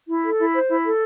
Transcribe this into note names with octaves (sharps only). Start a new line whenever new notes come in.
E4
A4
E4
C5
E4
A4